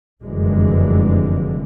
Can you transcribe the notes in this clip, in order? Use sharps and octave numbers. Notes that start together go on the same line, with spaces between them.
F1 F#2 D3 E3 G#3